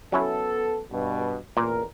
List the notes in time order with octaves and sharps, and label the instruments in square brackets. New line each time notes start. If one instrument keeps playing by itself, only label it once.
[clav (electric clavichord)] F#3 C#4 E4 [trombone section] B3 A4
[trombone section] G2 B2
[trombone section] A1 E2 A#4 [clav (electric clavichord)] A#2